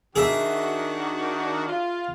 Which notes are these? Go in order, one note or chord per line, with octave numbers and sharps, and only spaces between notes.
D#3 D4 F#4 G#4 E5
F4